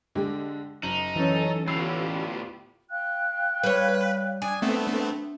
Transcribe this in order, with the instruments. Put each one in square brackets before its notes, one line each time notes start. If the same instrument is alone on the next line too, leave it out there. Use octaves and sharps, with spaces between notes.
[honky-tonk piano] D3 G#3 G4
[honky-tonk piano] F#1 F#7 [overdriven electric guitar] D#4
[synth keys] E3 C#4 [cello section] F#3 A4
[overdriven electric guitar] D2 A2 [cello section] B3 F4 G4 [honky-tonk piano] B5 E6 C7
[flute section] F5 G5 F#6
[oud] G3 C#5 [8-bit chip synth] B4
[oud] D4 [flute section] G5 D#6 [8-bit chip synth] G#5
[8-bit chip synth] A3 B3 C4 [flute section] E5